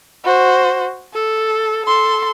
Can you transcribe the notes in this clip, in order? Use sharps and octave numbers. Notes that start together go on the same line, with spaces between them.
F#4 C5
A4
A4 C6